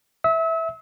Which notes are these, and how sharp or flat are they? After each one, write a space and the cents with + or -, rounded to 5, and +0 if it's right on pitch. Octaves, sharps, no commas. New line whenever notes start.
E5 -10 E6 -35